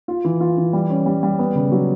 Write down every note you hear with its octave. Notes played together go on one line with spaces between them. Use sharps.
F4
E3
F4
E3
G3
C#4
G3
G3
B3
C#3
F#3